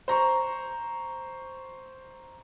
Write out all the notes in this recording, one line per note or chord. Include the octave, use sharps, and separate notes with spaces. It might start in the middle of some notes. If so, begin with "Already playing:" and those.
C5 A#5 C#6